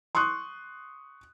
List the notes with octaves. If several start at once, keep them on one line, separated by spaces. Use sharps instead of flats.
C6 C#6 D#6 F#6